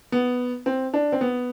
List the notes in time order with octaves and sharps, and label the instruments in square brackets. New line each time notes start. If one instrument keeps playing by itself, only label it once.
[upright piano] B3
C4
D4
C4
B3